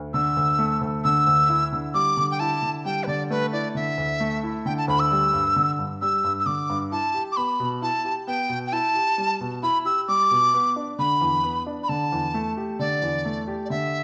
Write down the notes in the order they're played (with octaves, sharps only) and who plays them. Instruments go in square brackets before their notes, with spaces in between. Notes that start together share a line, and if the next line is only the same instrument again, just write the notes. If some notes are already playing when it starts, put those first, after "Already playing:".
Already playing: [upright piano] D2
[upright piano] D3 [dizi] E6
[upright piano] D2
A3
D2
[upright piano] D3 [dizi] E6
[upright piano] D2
E4
D3
[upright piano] G3 [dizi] D6
[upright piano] D3
[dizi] G5
[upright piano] E4 [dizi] A5
[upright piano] D3
[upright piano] G3 [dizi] G5
[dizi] B4
[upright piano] D3 [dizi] D5
[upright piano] A3 [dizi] B4
[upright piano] E4 [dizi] D5
[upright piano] D3 [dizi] E5
[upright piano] D2
A3
E4
[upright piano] D3 [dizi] G5
[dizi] A5
[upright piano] D2 [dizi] B5
[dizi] E6
[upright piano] G3
G2
D3
G2
[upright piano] G3 [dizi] E6
[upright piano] G2
[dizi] E6
[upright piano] D3 [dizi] D6
[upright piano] G2
[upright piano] E4 [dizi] A5
[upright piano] G4
[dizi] D6
[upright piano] B3 [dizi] B5
[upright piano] B2
[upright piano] E4 [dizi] A5
[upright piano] G4
[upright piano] B3 [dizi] G5
[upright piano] B2
[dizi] G5
[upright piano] E4 [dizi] A5
[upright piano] G4
G3
B2
[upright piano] E4 [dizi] B5
[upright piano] G4 [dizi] E6
[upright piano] G3 [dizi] D6
[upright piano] B2
B3
D4
[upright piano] D3 [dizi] B5
[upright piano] E2
B3
D4
[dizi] B5
[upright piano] D3 [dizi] A5
[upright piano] E2
A3
G4
[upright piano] D3 [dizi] D5
[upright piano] E2
A3
G4
[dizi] D5
[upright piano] D3 [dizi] E5